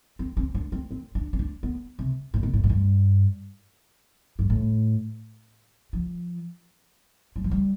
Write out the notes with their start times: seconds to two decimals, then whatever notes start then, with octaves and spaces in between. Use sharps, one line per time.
0.19 C4
0.37 C4
0.55 D4
0.72 C4
0.91 C4
1.15 D4
1.33 C4
1.39 D4
1.63 B3
1.99 C3
2.34 A2
2.43 B2
2.53 A2
2.64 A2
2.69 G2
4.39 G2
4.50 A2
5.93 F3
7.36 G3
7.44 F3
7.51 G3